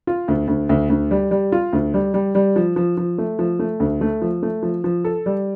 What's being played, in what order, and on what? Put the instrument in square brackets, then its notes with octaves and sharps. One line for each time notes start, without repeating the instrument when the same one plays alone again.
[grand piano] F4
D2
D2
D2
D2
G3
G3
F4
D2
G3
G3
G3
F3
F3
F3
A3
F3
A3
D2
A3
F3
A3
F3
F3
A4
G3